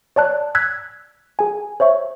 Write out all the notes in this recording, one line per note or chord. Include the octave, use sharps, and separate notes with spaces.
C#5 D5 A5 F#6
E6 F#6 G#6 B6
G#4 G#5
C5 C#5 E5 C#6